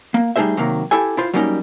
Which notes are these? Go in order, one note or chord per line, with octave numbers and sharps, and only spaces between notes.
A#3
G3 A3 D#4 G#4 C5 E5
C3 D#3 F#3 A#3
E4 G4 A4 G#5
E4 F4 C5
F#3 G3 A#3 C#4 D#4